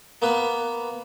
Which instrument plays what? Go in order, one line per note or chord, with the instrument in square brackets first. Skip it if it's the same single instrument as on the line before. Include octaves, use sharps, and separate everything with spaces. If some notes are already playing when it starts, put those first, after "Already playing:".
[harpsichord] A#3 B3 B4